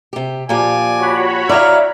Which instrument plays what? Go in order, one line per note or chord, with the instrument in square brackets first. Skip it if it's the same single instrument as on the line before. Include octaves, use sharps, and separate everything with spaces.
[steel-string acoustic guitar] C3 G4
[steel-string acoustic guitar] A#2 F3 G4 [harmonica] D5 G#5
[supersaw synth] F#4 C#5 B5
[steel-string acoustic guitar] E4 F5 [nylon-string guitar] D5 E5 [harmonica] A#5 F6